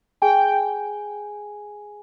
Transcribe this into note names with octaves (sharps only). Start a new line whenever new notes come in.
G#4 G5 G#5